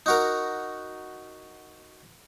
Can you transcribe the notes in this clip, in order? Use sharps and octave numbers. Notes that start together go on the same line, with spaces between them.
D#4 F#4 A#4